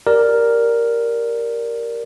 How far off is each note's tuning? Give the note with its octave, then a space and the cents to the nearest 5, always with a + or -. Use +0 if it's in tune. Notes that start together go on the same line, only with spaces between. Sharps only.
G4 +0 A#4 +0 D5 -5